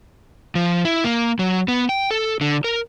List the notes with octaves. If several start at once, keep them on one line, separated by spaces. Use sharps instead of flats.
F3
E4
A#3
F#3
B3
G5
A4
D3
A#4